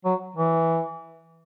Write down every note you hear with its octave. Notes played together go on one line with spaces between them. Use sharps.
F#3
E3